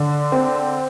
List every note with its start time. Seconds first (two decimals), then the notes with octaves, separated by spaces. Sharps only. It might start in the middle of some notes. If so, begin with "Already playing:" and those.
Already playing: D3
0.32 C4